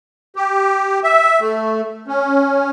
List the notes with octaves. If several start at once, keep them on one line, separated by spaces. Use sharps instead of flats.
G4
E5
A3
C#4